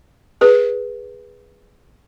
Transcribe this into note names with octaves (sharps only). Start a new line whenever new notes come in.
G#4 B4